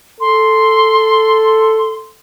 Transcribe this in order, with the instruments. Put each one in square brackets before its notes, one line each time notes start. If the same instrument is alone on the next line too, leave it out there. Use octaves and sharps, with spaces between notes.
[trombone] A4 [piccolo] C6